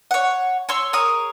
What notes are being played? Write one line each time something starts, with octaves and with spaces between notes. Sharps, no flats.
C#5 F#5
C#5 C6 E6
G#4 A#4 C#5 D#6